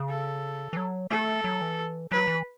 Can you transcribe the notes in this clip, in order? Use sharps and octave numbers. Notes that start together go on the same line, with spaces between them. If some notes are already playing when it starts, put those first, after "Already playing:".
Already playing: C#3
A4
E3
F#3
A3 A4
F#3
E3
F#3 B4
E3